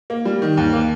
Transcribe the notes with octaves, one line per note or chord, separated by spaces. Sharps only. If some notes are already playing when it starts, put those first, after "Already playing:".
A#3
G3
D#3
D#2
A#3